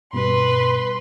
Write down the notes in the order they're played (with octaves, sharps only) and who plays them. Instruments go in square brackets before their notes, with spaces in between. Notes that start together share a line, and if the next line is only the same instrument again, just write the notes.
[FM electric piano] G2 B2 G3 [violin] B4 C6